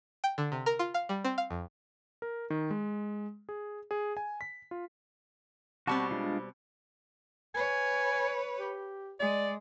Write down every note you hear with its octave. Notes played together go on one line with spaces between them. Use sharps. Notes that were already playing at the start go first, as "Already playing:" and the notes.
G5
D3
C3
A#4
F4
F5
G3
C4
F5
F2
A#4
D#3
G#3
G#4
G#4
G#5
B6
F4
B2 G3 C4 F#4 A5 C#6
G#3 D4 F4
B4 C#5 G#5
G4
G#3 D5